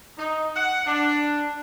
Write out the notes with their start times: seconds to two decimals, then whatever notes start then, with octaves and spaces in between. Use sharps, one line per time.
0.18 D#4
0.55 F#5
0.86 D4